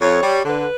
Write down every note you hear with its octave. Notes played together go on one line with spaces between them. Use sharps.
F2 C#5
G3
D3 B4